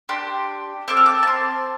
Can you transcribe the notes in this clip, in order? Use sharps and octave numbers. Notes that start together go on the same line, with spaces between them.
D4 G4 C6
C4 A4 D6
F6
D6
A5
C6